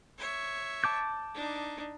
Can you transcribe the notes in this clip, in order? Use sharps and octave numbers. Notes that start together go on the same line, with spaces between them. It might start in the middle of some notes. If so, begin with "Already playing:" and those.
C#5 E5
A5 D6 G6
D4 D#4